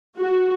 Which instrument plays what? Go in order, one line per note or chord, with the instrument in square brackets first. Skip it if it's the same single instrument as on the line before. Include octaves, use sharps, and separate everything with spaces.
[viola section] F#4